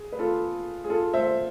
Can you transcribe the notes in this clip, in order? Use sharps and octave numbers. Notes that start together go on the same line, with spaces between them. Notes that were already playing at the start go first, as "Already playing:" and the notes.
Already playing: G#4
B4
F4 A4
G#4
F4 A4
C5 E5